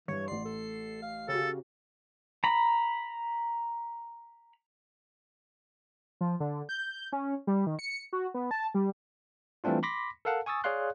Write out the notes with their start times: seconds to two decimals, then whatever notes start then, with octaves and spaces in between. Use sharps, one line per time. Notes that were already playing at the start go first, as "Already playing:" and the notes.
0.08 G2 E3 C#5
0.28 A1 D5 C6 C7
0.45 A4
1.02 F5
1.28 C#3 F#4 G4 A4
2.44 A#5 B5
6.21 F3
6.40 D3
6.69 G6
7.12 C#4
7.47 G3
7.67 D#3
7.79 C#7
8.13 F#4
8.34 B3
8.51 A5
8.74 G3
9.64 E3 G3 A3 C4 D4 F4
9.83 B5 C6 D6 A#6 B6
10.25 A4 A#4 F5 F#5 A5
10.46 G#5 C#6 D#6 E6 A6
10.64 G#4 C#5 D5 F5 C6 F#6